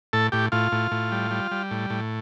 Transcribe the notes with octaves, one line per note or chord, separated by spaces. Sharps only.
A2 A4
A2 G4
A2 F4
A2
A2
G3
G3
G3
A2
A2